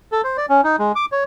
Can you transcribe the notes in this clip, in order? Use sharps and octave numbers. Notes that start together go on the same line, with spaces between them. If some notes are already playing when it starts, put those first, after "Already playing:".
A4
C5
D5
C#4
D#4
G#3
D6
C#5